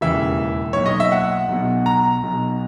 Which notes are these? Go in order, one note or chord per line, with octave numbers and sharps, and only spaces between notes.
E1 D#2 C#3 E3 E5
B1 A#2 C#5
D#5
E5
F#5
B1 B2
A#5
B1 B2